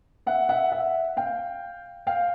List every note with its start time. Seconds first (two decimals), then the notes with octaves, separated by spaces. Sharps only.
0.26 E5 F#5
0.49 E5 F#5
0.72 E5 F#5
1.17 F5 G5
2.07 F5 G5